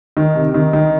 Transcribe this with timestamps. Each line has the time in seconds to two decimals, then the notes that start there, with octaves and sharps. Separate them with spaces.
0.17 D#3
0.35 C3
0.54 D#3
0.73 D#3